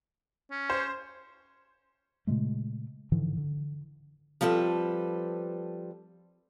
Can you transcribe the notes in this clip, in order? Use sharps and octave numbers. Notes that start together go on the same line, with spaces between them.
C#4
C5
A#2 C#3 G#3 A3
G#2 D3 E3 F3
D3
F3 G3 C4 A4 B4